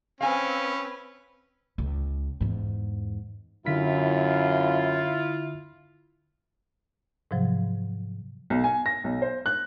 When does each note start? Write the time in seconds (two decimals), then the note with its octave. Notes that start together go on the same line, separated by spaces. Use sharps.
0.21 C4 C#4 B4 F5 G#5
1.78 C#2
2.41 E2 G#2
3.66 F#2 D3 E4 F4 B6
7.31 G#2 C3 F3 F#3
8.50 B1
8.64 G#5
8.86 A#6
9.04 B1
9.22 C5
9.46 F#6